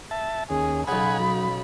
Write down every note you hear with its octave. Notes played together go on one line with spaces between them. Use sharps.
E5 A5
D#2 C#4 G#4
B1 C#3 F#5 G#5 B5
F#3